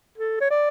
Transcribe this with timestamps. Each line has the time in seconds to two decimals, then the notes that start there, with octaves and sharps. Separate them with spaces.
0.18 A4
0.40 C#5
0.50 D5